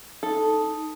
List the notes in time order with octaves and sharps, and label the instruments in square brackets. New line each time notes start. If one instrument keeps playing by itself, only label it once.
[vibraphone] D#4 [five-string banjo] A4